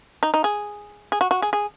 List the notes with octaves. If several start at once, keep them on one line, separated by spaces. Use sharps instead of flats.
D#4
D#4
G#4
G#4
F#4
F#4
G#4
G#4